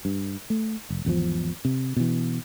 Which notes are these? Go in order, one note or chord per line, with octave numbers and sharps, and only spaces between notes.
G2
A3
F1
G#1 E2 C#3 F3
C3
B2 E3